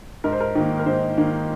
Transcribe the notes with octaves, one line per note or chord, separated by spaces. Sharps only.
G#2 A#4
C5
A#4
D#3 A#3
A#4
G#2 C5
D#3 A#3